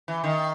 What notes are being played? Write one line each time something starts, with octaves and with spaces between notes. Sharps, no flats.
E3
D#3